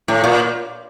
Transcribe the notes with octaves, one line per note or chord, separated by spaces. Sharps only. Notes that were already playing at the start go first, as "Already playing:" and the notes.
A2
A#2